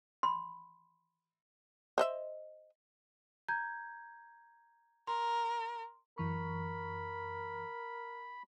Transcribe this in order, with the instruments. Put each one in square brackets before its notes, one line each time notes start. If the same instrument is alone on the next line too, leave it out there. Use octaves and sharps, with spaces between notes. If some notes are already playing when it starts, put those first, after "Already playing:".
[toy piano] B5 C6
[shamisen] C5 D#5 E5
[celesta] A#5 G6 G#6
[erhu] A#4 [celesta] C6
[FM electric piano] F#2 E3 C#6 [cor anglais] A#4 [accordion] B5